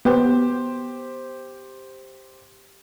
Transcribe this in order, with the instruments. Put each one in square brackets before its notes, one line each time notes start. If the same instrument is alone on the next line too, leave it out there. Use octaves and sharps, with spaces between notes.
[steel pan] B3 [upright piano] G4 C5